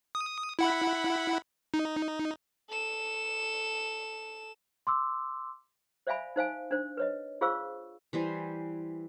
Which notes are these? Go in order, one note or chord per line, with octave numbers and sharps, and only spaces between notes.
D#6
E4 F#5 B5
D#4
A4 E7
C6 D6 E6
C5 D5 E5 F5 G#5 B5
D#4 C5 F5 G#5
D4 C5
B4 C#5 D#5
F4 G#4 C5 F5 C#6 E6
E3 G3 C5 G#5